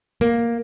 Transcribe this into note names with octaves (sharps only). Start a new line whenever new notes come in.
A#3